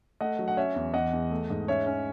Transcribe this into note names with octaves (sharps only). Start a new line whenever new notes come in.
A3 D#5 F#5
F#3
F#5
C#4 C#5 E5
E2
E2 D#5 F#5
E2
A3
G#2
C#4 C#5 E5
C#4